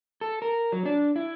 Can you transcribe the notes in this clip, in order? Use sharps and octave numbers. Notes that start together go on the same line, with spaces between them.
A4
A#4
F#3
D4
E4